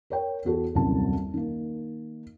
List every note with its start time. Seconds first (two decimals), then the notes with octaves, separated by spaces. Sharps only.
0.10 A#4 C#5 G5
0.45 E2 F#4 A4
0.74 D#1 C2 F#2 F#3 C4 A5
1.34 D#3 A#3